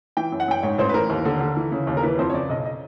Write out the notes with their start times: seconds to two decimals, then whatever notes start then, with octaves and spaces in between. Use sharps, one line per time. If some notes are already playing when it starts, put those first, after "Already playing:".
0.17 E3 G5
0.32 F#2
0.40 F#5
0.48 F#2 G5
0.63 G#2 C#5
0.78 A1 C5
0.89 B4
0.94 E3 A#4
1.10 D#2
1.25 D3
1.40 D3
1.57 E3
1.72 C#3
1.87 D#2
1.97 A#4
2.03 E3 B4
2.19 F2 C5
2.30 C#5
2.33 C#3 D5
2.49 B1 D#5
2.66 D#5